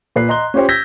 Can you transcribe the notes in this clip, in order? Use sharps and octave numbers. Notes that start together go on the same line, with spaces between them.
A#2 B4 C7
D#5 A#5 C6 F#6 G7
C#4 F4 G4 C5 C#5 G5
E6 G6 G#6 A#6 B6